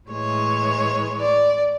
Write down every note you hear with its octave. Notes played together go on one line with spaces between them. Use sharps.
A2 E3 G#3 C#5
D5